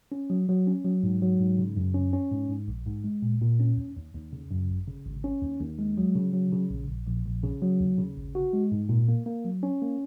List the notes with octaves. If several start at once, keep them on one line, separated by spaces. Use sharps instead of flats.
C#4
F#3
F#3
C#4
F#3
G#2
F#3
G#2
C#3
F#2
C#4
C#4
G#2
G#2
A#1
G#2
G#3
A#2
A#2
C#4
D#2
D#2
D#2
C#3
F#2
G#1
C#3
G#1
C#4
D#2
D#2
G#3
F#3
C#3
F#3
C#3
A#1
A#1
A#1
A#1
C#3
F#3
D#2
C#3
G#1
F#4
G#3
G#2
A#2
A#3
A#3
F#3
C#4
A#3